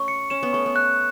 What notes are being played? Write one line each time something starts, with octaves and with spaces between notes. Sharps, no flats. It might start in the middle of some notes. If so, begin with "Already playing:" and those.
Already playing: A3 C#4 C#6
C#7
C#4 E7
B3
A3 C#6
B3
F#6